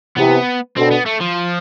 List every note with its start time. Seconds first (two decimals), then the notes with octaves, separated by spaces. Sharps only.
0.17 C3 E3 B3
0.76 B2 D3 C4
0.91 B3
1.06 A3
1.21 F3